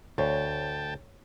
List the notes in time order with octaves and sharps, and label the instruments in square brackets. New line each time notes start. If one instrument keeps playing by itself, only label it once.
[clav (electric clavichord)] D2 [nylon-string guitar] C#5 [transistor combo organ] G5 A5